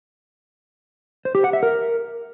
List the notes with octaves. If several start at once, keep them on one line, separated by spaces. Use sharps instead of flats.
C5
G4
F#5
E5
A#4